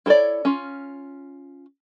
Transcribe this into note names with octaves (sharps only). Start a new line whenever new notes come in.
E4 A4 B4 C#5 D5
C#4 F4